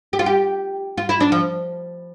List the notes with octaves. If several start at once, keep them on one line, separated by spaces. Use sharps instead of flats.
G4
F4
G4
F4
E4
D4
F3